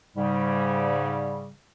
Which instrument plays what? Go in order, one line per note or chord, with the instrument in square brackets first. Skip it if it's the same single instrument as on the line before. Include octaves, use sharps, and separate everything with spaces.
[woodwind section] G#2 C#3 G3